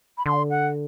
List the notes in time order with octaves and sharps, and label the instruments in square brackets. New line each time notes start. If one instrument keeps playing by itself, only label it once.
[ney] B5
[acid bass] D3 [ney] C6
[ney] F#5